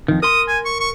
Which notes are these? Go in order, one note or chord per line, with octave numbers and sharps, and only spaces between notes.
F2 D#3
A#4 C6 D#6
G#5
C#6
C#6